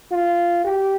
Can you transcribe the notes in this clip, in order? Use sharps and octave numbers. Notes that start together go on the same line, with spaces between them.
F4
G4